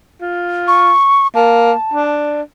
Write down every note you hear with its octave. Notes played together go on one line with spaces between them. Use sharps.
F4
C#6
A#3 A5
D4